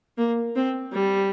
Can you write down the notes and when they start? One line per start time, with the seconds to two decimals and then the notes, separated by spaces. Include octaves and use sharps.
0.18 A#3
0.56 C4
0.93 G3